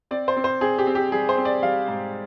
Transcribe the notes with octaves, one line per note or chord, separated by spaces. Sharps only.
C4 D5
C5
C4
C5
C4 G#4
G4
C4
G4
G3 G#4
C5
C4
D5
G3 F5
G#2